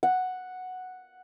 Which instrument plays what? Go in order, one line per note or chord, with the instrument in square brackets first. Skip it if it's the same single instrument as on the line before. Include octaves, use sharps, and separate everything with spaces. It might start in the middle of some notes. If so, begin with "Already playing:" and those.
[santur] F#5